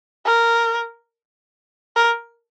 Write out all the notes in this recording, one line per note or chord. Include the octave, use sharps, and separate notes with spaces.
A#4
A#4